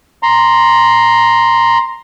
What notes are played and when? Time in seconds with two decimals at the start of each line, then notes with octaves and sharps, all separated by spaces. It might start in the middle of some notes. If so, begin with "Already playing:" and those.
0.23 A#5 C6